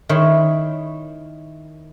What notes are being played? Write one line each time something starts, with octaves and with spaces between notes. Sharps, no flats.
D#3 E4 C#5 B5 C6